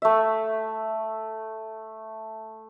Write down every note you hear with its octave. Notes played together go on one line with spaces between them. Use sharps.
A3 E5